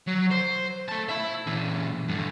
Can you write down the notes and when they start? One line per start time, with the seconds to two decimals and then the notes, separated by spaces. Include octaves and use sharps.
0.07 F#3
0.31 C5
0.89 A3 A5
1.09 E4 E5
1.47 A#2 E3
2.08 G2 D3